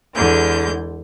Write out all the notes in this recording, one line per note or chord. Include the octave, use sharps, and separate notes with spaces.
E2 D3 G#3 G6